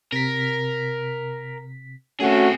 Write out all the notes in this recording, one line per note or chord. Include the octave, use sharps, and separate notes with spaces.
C3 A#4 B6
A3 C4 C#4 F#4 G#4